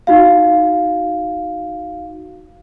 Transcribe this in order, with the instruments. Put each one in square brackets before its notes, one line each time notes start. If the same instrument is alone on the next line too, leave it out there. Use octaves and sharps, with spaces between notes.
[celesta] D#4 F#4 F5